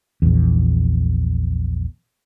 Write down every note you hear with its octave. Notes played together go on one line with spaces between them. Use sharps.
A#1 E2